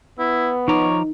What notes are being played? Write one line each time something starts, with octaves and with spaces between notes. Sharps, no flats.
B3 E4
F3 D#4 C#5 A#5 D6